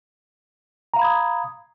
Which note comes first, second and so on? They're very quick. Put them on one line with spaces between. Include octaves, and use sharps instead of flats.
A#5 F5 B5 G#6 D#6